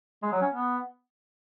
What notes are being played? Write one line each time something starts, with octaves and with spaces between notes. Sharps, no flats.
G#3
F#3
C#4
B3